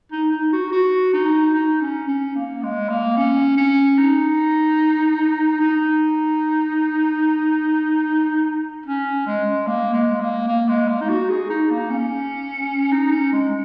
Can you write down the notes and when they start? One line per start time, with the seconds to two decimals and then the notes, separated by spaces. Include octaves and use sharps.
0.12 D#4
0.32 D#4
0.52 F#4
0.72 F#4
1.13 D#4
1.54 D#4
1.81 C#4
2.08 C#4
2.35 A#3
2.63 G#3
2.89 A#3
3.17 C#4
3.57 C#4
3.98 D#4
5.60 D#4
8.86 C#4
9.27 G#3
9.67 A#3
9.94 G#3
10.21 A#3
10.48 A#3
10.69 G#3
10.89 A#3
11.01 D#4
11.09 F#4
11.29 G#4
11.50 D#4
11.70 A#3
11.90 C#4
12.92 D#4
13.12 C#4
13.33 G#3